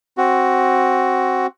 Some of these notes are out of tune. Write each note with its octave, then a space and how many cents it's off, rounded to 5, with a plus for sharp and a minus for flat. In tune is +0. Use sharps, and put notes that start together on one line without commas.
C4 +15 F#4 +10